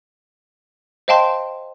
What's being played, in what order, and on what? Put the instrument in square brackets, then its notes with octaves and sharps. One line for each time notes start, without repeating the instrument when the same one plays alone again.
[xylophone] C5 D#5 F5 G5 A5 C6